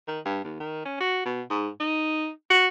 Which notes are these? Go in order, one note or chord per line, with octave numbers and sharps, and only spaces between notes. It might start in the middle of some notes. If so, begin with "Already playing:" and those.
D#3
G2
D#2
D#3
C#4
F#4
B2
G#2
D#4
F#4